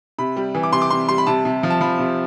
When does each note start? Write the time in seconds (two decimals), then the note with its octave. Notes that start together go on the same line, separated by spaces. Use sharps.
0.18 C3 B5
0.37 G3
0.55 E3
0.63 D6
0.72 C3 C6
0.82 D6
0.90 C3 C6
1.09 G3 C6
1.18 B5
1.27 C3 A5
1.45 C3
1.63 F3
1.70 A5
1.81 F3 B5
1.99 C3